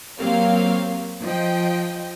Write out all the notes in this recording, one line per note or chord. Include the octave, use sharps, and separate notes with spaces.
F#3 A#3 C4 G4 C#5 F5
F3 D#5 G5